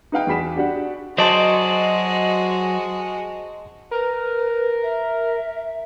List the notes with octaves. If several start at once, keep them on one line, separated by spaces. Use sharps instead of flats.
D#4 B4 F5 G5
E2 F#4 G#4 B5 B6 E7
D4 F#4 G4 D5 F#5
F#3 G#3 F#4 C5 D5 D#5 A5 C6
A#4 B4
E5